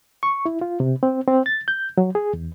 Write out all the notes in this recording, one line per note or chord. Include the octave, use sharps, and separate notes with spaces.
C#6
E4
F4
C3
C4
C4
A6
G6
F#3
G#4
E2